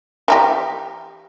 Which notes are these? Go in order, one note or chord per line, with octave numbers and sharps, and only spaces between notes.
E3 D#4 G4